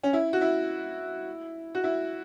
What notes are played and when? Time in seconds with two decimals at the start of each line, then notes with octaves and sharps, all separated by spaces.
0.03 C#4
0.13 E4
0.33 F#4
0.41 E4
1.75 F#4
1.84 E4